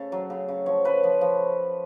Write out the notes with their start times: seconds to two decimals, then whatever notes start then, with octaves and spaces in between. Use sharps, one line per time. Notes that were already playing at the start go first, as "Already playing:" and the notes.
Already playing: C#3 A4
0.12 F#3
0.30 C#3
0.48 C#3
0.66 F3 C#5
0.85 C#3 B4
1.04 F3
1.21 F3